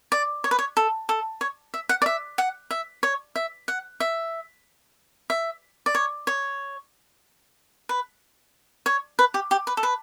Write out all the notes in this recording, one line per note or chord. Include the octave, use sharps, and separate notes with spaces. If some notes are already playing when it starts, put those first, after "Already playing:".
D5
C#5
B4
C#5
A4
A4
C#5
E5
F#5
D5
E5
F#5
E5
C#5
E5
F#5
E5
E5
D5
C#5
C#5
B4
C#5
B4
G4
G4
B4
A4
B4